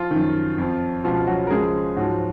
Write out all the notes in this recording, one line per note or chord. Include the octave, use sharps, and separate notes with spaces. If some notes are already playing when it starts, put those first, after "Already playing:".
Already playing: F3 F4
F#2 D#3
F2 F3
C#2 B2 F3 F4
F#3 F#4
A#4
C#2 C#3 F3 G#3 G#4
G#2 F3 F#3 F#4